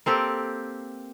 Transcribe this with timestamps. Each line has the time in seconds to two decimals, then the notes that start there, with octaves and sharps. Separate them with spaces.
0.06 A#3 C4 G4 A4